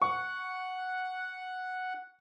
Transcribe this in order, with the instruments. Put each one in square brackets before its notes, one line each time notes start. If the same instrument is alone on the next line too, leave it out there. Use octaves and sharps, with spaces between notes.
[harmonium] F#5 [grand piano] C#6